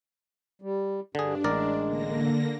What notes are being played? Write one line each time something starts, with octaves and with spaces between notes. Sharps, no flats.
G3
G2 D3 D4 G#4
A1 G#3 A#4 D5
D3 A#3 A#6